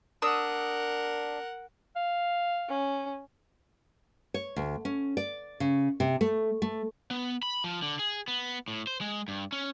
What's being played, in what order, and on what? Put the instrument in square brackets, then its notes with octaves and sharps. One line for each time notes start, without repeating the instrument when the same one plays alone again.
[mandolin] D4 D#6 E6 [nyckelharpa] A#4 F#5
[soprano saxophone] F5
[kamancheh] C#4
[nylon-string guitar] C#5
D2
C#4
D5
C#3
C3
A3
A3
[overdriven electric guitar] B3
B5
F3
D3
G#4
B3
A2
C5
G#3
G2
C#4